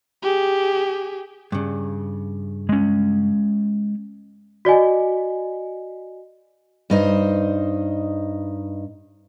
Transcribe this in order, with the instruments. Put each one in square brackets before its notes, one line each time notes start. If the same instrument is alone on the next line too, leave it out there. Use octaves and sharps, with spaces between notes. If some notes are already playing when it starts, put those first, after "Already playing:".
[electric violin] G4 G#4
[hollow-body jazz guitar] G2 C#3
[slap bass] G#3 C#4
[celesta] F#4 D5 D#5 G#5
[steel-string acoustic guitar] G2 D#4 C5 D#5